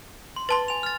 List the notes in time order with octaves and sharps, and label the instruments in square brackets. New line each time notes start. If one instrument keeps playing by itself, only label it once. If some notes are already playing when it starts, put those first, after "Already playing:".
[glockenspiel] C6
[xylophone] B4 A5 C6 [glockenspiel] A6 G7
[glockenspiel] G#5 F7
F6 A6